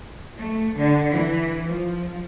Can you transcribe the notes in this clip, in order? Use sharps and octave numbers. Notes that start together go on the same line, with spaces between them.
A3
D3
E3
F3